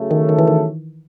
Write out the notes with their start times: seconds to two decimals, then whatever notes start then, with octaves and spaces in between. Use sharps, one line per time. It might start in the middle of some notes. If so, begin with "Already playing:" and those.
Already playing: C#3 F#3 A3
0.11 D#3
0.29 D#3
0.39 E3
0.47 D#3